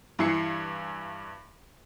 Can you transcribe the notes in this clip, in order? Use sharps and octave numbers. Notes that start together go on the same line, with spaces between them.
G2 E3 E4 C7 C#7